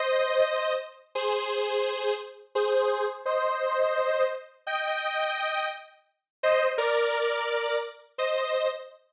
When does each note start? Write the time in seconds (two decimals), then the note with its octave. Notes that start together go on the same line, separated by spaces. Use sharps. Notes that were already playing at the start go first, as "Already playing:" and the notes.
Already playing: C5 D#5
1.15 G#4 C5
2.55 G#4 C5
3.26 C5 D#5
4.67 D#5 G5
6.43 C5 D#5
6.78 A#4 D5
8.18 C5 D#5